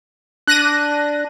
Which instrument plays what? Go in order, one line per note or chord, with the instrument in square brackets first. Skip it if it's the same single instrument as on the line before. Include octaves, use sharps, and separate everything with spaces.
[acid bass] D4 [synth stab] F#6 A#6 D#7